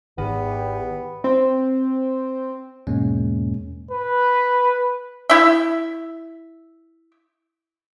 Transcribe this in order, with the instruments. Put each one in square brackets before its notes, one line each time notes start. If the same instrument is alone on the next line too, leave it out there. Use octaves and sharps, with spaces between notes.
[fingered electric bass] G#1 [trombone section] E2 G4 [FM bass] D#3 [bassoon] B3
[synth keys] C4
[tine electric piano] E2 G#2 B2 G#3 A#3 C#4
[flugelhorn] B4
[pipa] E4 E5